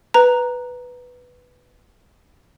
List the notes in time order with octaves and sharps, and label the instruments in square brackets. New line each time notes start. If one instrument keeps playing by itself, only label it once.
[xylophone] B4 A#5